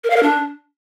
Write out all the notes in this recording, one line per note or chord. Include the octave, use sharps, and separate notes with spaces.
A#4
F5
A#4
D4